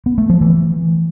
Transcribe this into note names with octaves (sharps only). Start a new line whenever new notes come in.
B3
A3
F3
E3